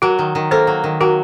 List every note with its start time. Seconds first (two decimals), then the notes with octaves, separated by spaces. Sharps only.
0.02 F#3 F#4 A#4
0.19 D#3
0.35 D#3
0.51 A#3 A4 C5
0.67 F#3
0.84 D#3
1.01 F#3 F#4 A#4